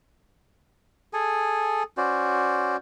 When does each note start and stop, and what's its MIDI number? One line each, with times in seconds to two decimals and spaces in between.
1.13 1.83 68
1.13 1.83 69
1.13 1.83 80
1.98 2.76 61
1.98 2.76 66
1.98 2.76 72
1.98 2.76 74